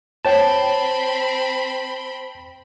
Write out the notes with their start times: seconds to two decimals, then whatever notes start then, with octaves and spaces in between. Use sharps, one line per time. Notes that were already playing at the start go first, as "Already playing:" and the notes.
0.25 C4 F4 C#5 G5 A5 B5